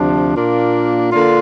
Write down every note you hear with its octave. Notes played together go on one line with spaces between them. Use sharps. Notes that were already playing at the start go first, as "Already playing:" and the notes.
Already playing: D2 C3 F3 D4
A#2 A#3 D4 F4
D3 A#3 D4 F4